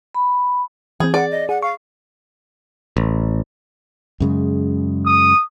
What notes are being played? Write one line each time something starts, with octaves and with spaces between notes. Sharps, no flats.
B5
E3 C4 G#4
G#4 D5 F#5
D#5
G#4 F#5
F5 C#6
A1
F#2 C#3 G#3
D#6